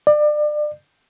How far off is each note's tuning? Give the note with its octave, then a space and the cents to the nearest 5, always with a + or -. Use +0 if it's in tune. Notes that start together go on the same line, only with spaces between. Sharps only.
D5 +30